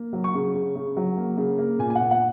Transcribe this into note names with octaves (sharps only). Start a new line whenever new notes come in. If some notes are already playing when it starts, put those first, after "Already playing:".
Already playing: A#3
F#3
C#6
C#3
C#3
C#3
F#3
A#3
C#3
A#3
A#2 G#5
G#5
A#2 F#5
F#5